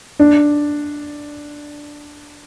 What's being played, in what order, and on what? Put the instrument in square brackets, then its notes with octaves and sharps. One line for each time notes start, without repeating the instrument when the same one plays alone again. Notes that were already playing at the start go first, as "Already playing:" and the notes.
[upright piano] D4